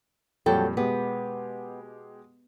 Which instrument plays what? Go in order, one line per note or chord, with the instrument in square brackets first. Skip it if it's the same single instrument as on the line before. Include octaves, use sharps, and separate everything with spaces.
[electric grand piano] F2 A#2 G3 [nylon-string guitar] F#3 A4 G5
[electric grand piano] B2 G#3 G4 [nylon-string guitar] B3